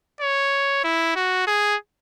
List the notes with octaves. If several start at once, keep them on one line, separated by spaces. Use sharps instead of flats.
C#5
E4
F#4
G#4